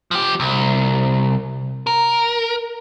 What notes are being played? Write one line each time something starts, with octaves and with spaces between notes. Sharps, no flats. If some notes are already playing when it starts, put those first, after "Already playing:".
F3 G4
C2
A#4